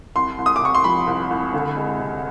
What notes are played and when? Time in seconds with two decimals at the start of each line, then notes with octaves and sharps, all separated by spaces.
0.16 C2 C6
0.38 C2
0.46 D#6
0.56 D6
0.61 C3 C#6
0.75 C6
0.84 F3 B5
1.07 C2
1.30 C2
1.54 D2
1.76 G#3
1.99 C3